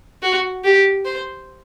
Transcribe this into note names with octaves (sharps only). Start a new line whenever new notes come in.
F#4
G4
C5